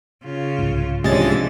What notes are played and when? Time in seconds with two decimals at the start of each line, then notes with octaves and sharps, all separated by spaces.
0.25 C#3 F4
0.59 C2 G#2
1.04 C3 E3 F3 G#3 C#4 D4 A6